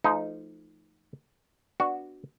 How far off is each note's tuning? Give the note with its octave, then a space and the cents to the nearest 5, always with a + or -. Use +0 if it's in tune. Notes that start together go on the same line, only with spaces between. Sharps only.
F3 -25 A3 +0 D#4 +0
B3 +0 D4 +0 F#4 +0